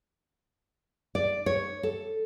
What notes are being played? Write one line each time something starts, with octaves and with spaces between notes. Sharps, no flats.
D5
C#5
A4